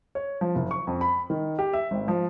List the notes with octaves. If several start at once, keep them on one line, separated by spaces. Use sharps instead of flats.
C#5
F3
F#1
C#6
F2
B5
D#3
G4
E5
G#1
F3